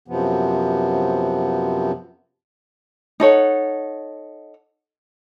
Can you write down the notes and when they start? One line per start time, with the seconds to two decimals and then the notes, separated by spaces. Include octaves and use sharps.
0.08 F#2 C3 F3 B3
3.20 D#4 A4 C#5 F#5